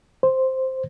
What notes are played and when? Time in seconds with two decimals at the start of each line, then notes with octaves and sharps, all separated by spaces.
0.23 C5